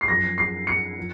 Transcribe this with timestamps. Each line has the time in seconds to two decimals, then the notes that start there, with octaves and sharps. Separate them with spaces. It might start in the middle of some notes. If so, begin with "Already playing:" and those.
0.01 C7
0.08 F#2 F3 A#6
0.38 C7
0.67 C#7
0.98 F3